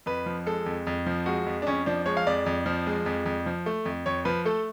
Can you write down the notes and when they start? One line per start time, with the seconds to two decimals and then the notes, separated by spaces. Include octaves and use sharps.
0.06 F2 B4
0.26 F3
0.46 G#3 A4
0.66 F2
0.87 F2
1.06 F3
1.26 G#3 F#4
1.46 F2
1.62 D4
1.67 F2 C#4
1.86 F3 D4
2.06 G#3 C#5
2.17 F5
2.27 F2 D5
2.46 F2
2.66 F3
2.87 G#3
3.06 F2
3.26 F2
3.46 F3
3.66 A3
3.85 F2
4.06 F2 C#5
4.25 F3 B4
4.45 A3 A4